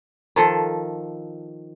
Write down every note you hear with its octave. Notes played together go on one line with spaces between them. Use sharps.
D#3 F3 A4